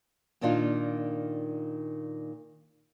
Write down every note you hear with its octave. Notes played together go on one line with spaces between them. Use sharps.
A#2 D#3 A#3 D4 D#4 F4